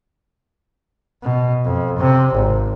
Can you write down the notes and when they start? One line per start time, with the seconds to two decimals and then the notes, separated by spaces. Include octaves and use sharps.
1.23 B2
1.65 F2
1.98 C3
2.35 G#1